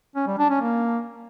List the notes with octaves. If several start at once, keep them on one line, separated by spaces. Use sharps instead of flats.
C#4
G3
D4
C#4
A#3